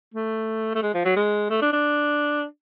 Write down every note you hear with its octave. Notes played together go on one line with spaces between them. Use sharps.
A3
A3
G#3
F3
F#3
G#3
A3
D4
D4